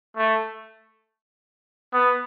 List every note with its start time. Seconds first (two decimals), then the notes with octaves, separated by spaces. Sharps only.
0.17 A3
1.93 B3